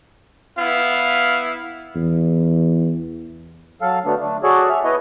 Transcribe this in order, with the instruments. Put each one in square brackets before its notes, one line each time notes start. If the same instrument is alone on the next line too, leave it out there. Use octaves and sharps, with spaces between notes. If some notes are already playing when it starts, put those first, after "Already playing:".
[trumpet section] B3 E4 F5
[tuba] E2
[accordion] F#3 A4 F5
D3 F#3 A3 B3 D4
D3 A3 D4
F#4 G#4 A4 C#5 D5
E5 F6
B3 E4 B4 C#5 D#5